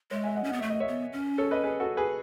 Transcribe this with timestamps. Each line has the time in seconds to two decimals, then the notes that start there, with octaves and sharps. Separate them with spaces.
0.11 G#3 C#5 E5
0.24 E5 G#5
0.36 D#5 F#5
0.44 C#4
0.49 B3 F#5
0.59 A3 E5
0.70 D#5
0.80 C#5 E5
0.88 B3
1.13 C#4
1.38 A4 C#5
1.51 B4 D#5
1.64 G#4 B4
1.80 F#4 A4
1.97 G#4 B4